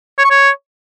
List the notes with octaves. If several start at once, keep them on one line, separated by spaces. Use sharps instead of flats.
C#5
C#6
C#5